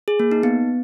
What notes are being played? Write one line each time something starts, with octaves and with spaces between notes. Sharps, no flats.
G#4
A#3
D#4
B3